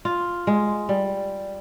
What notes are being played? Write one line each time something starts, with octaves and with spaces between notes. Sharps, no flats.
F4
G#3
G3